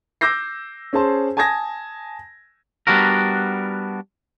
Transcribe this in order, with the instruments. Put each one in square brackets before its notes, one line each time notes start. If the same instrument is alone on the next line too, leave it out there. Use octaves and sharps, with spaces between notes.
[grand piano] D6 E6 G6 A#6 C7
C#4 G#4 C5 A5 C6
G#5 A5 D#6 G#6 A#6
[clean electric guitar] G3 B3 D4 F#4 A#4